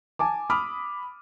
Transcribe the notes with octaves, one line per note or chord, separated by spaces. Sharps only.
G#5 A5 D6
B5 D6 D#6 F6